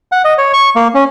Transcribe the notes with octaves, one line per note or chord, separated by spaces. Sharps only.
F#5
D#5
C#5
C#6
A#3
C#4